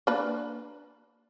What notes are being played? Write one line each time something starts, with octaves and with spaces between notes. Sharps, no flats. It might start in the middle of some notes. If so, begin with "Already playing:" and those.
A#3 D4 B4